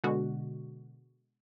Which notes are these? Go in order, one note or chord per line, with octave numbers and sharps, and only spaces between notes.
B2 D3 G#3 F#4